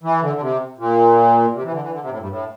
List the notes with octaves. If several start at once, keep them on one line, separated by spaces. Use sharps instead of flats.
E3
D3
D3
C3
A#2
C3
E3
D3
E3
D3
C3
A2
G2
A2